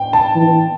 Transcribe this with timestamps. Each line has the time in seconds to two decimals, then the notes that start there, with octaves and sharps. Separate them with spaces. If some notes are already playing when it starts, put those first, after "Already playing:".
Already playing: G5
0.13 A5
0.35 E3